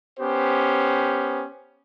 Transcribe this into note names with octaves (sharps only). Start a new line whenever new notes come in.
B3 C#4 G4 C5